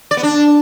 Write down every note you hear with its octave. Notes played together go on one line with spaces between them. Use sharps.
D5
B3
D4